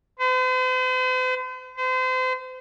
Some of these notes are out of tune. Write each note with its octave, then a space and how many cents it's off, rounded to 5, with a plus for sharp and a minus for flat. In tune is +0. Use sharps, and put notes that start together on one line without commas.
C5 -45
C5 -35